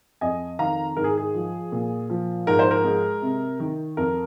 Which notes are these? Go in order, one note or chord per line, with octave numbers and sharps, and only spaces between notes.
F2 D#5 G#5
D#3 F5 A#5
G#2 A#4
G#4
G#4
F3
A#2
F3
G#2 A#4
C5
A#4
G#3
C3
D#3
F2 A#4